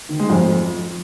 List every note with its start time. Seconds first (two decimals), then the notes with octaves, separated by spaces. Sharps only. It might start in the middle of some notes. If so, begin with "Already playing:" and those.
0.09 D#3
0.19 G#3
0.30 F2